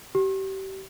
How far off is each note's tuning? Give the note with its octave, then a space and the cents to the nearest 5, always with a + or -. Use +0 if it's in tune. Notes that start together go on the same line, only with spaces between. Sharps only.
G4 -35